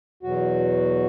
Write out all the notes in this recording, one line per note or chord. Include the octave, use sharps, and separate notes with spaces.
E2 B2 F#3 F#4